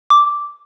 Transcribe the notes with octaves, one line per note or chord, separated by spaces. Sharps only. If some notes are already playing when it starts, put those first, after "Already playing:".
D6